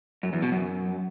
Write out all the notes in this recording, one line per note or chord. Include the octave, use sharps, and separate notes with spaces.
F#2
E2
B2
F#2